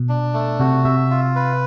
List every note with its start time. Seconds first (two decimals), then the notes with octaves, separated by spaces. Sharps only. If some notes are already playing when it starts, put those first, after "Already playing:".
Already playing: B2
0.09 D4
0.34 A3
0.60 C3 F#4
0.84 C3 E5
1.11 F4
1.36 B4